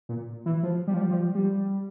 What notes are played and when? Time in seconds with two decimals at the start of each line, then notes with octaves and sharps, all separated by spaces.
0.09 A#2
0.46 E3
0.63 F3
0.87 G3
0.94 F3
1.01 G3
1.11 F3
1.35 G3